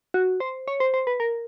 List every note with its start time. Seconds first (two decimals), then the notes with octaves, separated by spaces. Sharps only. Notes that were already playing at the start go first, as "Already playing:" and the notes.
0.14 F#4
0.40 C5
0.68 C#5
0.80 C5
0.94 C5
1.07 B4
1.20 A#4